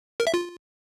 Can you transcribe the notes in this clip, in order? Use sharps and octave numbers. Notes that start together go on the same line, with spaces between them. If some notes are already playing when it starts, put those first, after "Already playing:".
A#4
E5
F4